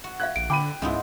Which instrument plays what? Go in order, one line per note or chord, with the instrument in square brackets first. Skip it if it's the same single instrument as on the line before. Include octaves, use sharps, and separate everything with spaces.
[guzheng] F#4
[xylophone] E5 F5 G#6 [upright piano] F#6
[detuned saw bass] A#1 [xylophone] D7
[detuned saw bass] D3 [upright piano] G5 B5 D#7 [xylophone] D6
[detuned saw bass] C#2 [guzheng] G#2 B3 C4 [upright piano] C#3 E4